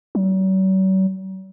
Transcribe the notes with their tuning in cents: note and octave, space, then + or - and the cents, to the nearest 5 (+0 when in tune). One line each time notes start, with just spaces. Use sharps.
F#3 +45